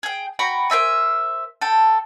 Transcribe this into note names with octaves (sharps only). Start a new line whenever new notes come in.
G#4 G5
F#4 G5 A#5 B5
A#4 C5 E5 G#5
A4 G5